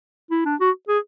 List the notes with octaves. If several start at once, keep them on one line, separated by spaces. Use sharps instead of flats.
E4
D4
F#4
G#4